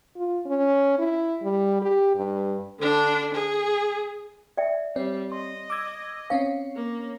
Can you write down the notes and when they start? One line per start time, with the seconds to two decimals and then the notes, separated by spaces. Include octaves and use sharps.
0.16 F4
0.46 C#4
0.99 E4
1.43 G3
1.82 G4
2.15 G2
2.79 D3 D4
3.34 G#4
4.57 D5 E5 G5
4.96 G3 C4 C#5
5.32 D#5 C6
5.70 D6 E6 G#6
6.30 C4 C#4 C#5 F5
6.76 A#3